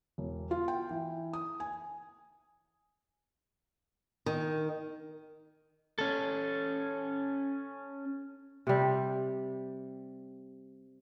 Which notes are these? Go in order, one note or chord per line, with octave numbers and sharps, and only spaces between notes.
E1
F4
G5
E3
D#6
G#5
D#3
C#4 A4
C3 G3